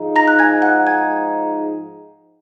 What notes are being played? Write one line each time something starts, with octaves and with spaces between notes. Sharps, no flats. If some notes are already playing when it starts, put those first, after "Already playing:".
Already playing: G#2 F3 G#3 D#4
A#5 A#6
F#6
G#5 G#6
F#5 F#6
G#5 G#6